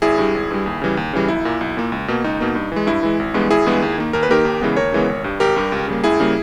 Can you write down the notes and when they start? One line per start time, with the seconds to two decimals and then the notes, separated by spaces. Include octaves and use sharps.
0.02 G#1 E4 G#4
0.18 G2 G3
0.34 G#1
0.51 G2 G3
0.66 D#2
0.82 C#3 E3 G3
0.97 D#2
1.13 C#3 E3 G3
1.28 B1 E4
1.45 A#2 A#3
1.61 B1
1.77 A#2 A#3
1.92 C#2
2.08 B2 A#3
2.24 C#2 D#4
2.40 B2 A#3
2.55 G2
2.72 E3 G#3
2.87 G2 E4
3.03 E3 G#3
3.20 G#1
3.34 G2 E3 G#3 B3
3.50 G#1 E4 G#4
3.66 G2 E3 G#3 B3
3.82 D#2
3.98 D#3 A#3
4.13 D#2 A#4
4.23 B4
4.29 D#3 A#3 G4 A#4
4.45 D#2
4.61 C#3 E3 G#3 B3
4.77 D#2 A#4 C#5
4.92 C#3 E3 G#3 B3
5.09 G#1
5.24 G2 G3
5.40 G#1 G4 A#4
5.56 G2 G3
5.72 C#2
5.88 C#3 G3 A#3
6.04 C#2 E4 G#4
6.20 C#3 G3 A#3